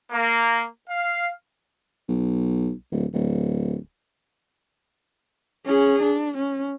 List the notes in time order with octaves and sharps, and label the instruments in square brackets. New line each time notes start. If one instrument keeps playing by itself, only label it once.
[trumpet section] A#3
F5
[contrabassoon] B1
D1
D1
[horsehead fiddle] C#4 G#4
D4
C#4